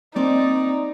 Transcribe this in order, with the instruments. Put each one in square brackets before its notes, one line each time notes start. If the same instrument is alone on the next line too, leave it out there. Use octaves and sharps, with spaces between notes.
[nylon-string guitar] A#3 C4 C5 [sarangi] D#4 [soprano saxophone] D5